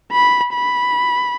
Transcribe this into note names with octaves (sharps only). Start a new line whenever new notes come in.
B5
B5